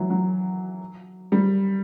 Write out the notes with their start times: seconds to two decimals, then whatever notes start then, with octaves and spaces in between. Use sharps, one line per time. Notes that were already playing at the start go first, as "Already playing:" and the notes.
Already playing: E3 F#3
0.10 F#3
1.32 G3